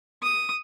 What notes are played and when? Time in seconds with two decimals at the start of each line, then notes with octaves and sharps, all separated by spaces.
0.23 D#6